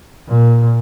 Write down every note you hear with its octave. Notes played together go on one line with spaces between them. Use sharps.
A#2